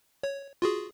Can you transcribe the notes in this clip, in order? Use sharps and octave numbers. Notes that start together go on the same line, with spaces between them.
C#5
F4 F#4 G#4